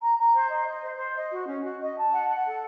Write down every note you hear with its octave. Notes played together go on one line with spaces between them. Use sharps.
A#5
A#5
C5
D#5
D#5
C5
C5
D#5
F#4
C#4
F#4
D#5
A5
F#5
F#5
A4